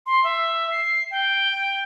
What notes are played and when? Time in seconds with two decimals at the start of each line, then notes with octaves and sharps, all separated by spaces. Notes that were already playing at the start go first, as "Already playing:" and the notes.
0.06 C6
0.24 E5
0.71 C7
1.11 G5